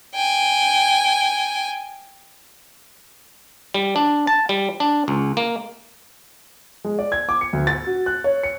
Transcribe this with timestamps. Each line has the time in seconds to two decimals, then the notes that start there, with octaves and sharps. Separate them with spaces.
0.15 G5 G#5
3.74 G3
3.96 D4
4.27 A5
4.49 G3
4.80 D4
5.08 C#2
5.37 A#3
6.84 G#3
6.99 D5
7.12 G#6
7.29 D6
7.41 C#7
7.53 D2
7.67 A6
7.87 F#4
8.06 F#6
8.24 C#5
8.43 C#7